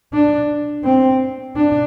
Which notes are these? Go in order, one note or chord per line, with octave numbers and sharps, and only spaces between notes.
D4
C4
D4